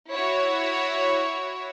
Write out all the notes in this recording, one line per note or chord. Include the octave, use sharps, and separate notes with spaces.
E4 F#4 C#5